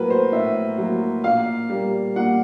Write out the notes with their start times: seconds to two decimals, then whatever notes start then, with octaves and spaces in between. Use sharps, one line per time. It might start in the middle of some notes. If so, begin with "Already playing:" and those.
Already playing: A2 F#3 A#3 A#4 B4
0.10 C5
0.33 A2 E5
0.78 F#3 A#3
1.24 A#2 F5
1.69 G3 A#3
2.16 A#2 F#5